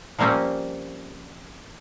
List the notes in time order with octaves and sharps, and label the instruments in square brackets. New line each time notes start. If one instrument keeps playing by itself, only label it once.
[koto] F3 G3 A#3 C4 C#4